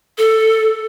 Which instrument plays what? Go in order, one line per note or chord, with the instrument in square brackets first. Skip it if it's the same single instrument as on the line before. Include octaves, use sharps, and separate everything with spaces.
[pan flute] A4